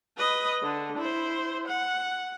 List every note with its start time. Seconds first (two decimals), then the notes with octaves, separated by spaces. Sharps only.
0.18 B4 D#5
0.63 D3
0.98 E4 C5
1.67 F#5